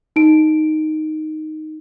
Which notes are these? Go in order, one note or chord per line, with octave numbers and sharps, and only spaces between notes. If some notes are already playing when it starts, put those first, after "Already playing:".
D#4 D7